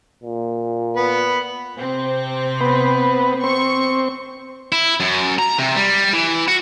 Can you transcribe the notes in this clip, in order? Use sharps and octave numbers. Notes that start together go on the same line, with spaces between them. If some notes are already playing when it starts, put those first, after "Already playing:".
A#2
B3 B4
C3 C4
B3
C4 C#6
E4
F#2
A#5
C3
G3
E3
F#4